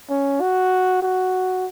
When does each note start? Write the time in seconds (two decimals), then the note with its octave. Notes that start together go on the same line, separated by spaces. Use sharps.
0.10 C#4
0.41 F#4
1.02 F#4